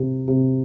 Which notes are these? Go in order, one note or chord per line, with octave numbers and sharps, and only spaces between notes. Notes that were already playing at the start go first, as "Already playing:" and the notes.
Already playing: C3
C3